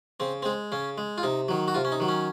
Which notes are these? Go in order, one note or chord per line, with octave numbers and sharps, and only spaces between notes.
C#3 C4
G#3 C4
C#3 C#4
G#3
F4
C3 D#4
D#3 F#3
F#4
C3 F4
C#4
D#4
D#3 F#3
C#4